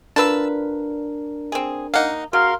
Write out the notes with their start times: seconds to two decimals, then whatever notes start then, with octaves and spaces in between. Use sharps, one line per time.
0.16 D3 D4 F4 A#4 B4 A5 E6
1.52 C4 G#4
1.94 A#3 D#4 F5 F#5
2.33 C#3 F#4 A#4 F5 C6